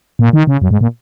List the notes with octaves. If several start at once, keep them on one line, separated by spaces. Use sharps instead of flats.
A#2
D#3
C#3
F#2
G#2
A#2